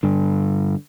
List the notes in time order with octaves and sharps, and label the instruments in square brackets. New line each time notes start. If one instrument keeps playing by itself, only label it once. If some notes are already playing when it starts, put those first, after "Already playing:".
[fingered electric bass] G2 D3